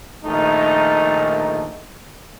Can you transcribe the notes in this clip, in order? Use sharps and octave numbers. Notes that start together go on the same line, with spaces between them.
A#1 D#3 A3 D#4